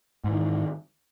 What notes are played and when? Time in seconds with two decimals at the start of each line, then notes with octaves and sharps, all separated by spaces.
0.24 G#2
0.29 E3
0.33 D#3